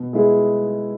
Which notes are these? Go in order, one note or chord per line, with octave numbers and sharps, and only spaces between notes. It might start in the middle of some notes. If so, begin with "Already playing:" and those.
Already playing: B2
G#3 B3 E4 G#4